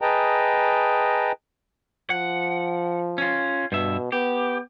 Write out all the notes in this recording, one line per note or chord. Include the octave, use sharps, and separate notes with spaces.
G#4 B4 D#5 G5 A5 A#5
F3 F#5
C#4 F4
G2 B2 E5
B3 G4